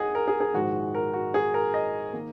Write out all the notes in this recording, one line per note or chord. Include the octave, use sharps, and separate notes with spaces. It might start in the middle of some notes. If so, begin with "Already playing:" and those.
Already playing: D#2 D#3 G#4 D#5 F#5
A#4
G#4
G#4
A#1 G#2 D#3 G#3 F#4
A#4
F#4
G#4
A#4
D#5
D#3 A#3